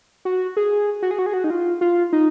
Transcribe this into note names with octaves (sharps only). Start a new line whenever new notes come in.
F#4
G#4
F#4
G#4
F#4
G#4
F#4
D#4
F4
F4
D#4